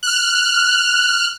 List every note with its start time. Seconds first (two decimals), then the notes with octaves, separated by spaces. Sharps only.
0.03 F6 F#6